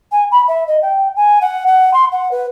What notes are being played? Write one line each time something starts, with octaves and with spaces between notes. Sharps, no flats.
G#5
B5
E5
D#5
G5
G#5
F#5
F#5
C6
F#5
B4